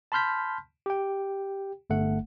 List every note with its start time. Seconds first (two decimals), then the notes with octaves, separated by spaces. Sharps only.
0.12 A5 B5 C6 F6 G6 B6
0.86 G4 G5
1.90 G1 A3 F#5